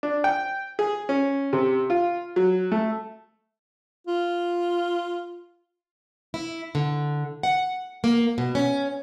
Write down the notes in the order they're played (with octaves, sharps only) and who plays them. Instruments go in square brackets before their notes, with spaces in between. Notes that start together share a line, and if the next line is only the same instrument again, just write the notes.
[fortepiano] D4
G5
G#4
C#4
C3
F4
F#3
A3
[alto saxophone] F4
[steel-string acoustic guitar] E4
D3
F#5
A#3
B2
C#4